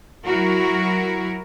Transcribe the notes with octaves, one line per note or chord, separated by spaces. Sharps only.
F#3 E4 F#4 A#4